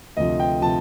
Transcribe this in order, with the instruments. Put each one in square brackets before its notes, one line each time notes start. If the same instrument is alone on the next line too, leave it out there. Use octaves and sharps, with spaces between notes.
[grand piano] D2 C3 F3 D#5
G5
C3 F3 A5